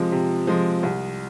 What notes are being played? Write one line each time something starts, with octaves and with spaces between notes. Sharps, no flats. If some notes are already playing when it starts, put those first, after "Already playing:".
Already playing: C3 F3 G#3
C3
F3 G#3
C2